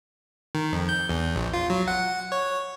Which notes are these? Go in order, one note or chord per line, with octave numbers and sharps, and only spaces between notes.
D#3
F2
G6
E2
A#1
F4
F#3
F#5
C#5